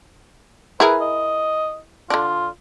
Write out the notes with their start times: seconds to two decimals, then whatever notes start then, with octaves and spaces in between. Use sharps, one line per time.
0.80 E4 G#4 A#4 B4
1.01 D#5
2.10 D3 D4 F4